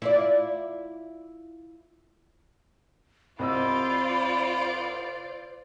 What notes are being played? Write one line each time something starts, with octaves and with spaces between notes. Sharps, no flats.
E4 F4 D5
C2 F4 C5 D5 D#5 B5 E6